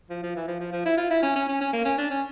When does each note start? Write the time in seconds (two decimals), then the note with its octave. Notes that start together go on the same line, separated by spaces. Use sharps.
0.10 F3
0.23 F3
0.36 E3
0.48 F3
0.60 F3
0.72 F3
0.86 E4
0.97 F4
1.11 E4
1.23 C#4
1.36 C#4
1.48 C#4
1.61 C#4
1.73 A#3
1.85 C#4
1.98 D4
2.10 C#4